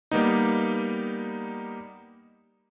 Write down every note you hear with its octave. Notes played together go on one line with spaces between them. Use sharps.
G3 A#3 B3 D#4